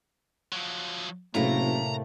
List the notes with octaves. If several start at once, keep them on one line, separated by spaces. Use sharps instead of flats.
F3 F#3
F#1 A2 C3 A3 A#3 A#5